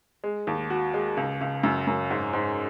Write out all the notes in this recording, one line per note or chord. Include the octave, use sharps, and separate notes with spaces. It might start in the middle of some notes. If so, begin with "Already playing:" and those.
G#3
D#2
F#4
G#3
C#2
C#2
F#2
F#2
G#2
G#2